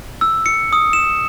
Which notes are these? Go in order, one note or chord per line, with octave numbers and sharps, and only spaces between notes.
E6
C#7
D#6
E7